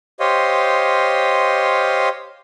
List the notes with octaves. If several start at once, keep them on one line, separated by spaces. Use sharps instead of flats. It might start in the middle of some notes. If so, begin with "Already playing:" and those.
G4 C5 C#5 D#5 F5 C6